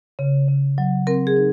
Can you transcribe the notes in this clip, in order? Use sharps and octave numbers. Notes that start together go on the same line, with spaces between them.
C#3
C#3
F#3
C4 A#4
G#4
D#4